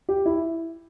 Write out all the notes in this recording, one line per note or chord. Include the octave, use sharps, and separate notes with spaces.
G4
E4